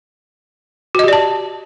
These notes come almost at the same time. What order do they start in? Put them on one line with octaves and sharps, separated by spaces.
F#4 D#5 G4 D5 A5